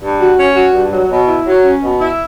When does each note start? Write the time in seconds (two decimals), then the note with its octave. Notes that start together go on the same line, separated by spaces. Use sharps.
0.01 G2
0.19 F#4
0.38 C#4
0.55 F#4
0.73 G2
0.92 F#3
1.10 B2
1.27 E4
1.46 F#3
1.64 C#4
1.82 B2
2.00 E4